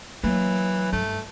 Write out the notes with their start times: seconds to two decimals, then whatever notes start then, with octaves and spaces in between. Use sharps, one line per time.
0.24 E3 F#3 A#3
0.93 G2 A3